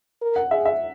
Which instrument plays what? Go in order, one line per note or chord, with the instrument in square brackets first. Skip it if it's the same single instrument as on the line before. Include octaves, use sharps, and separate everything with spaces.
[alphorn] A#4
[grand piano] F#5
[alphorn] G#4 [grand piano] E5
[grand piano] E5